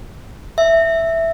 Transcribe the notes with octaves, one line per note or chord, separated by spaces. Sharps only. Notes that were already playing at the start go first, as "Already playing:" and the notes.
E5